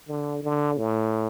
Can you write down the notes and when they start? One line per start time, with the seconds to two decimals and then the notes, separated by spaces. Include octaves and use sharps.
0.08 D3
0.43 D3
0.78 A2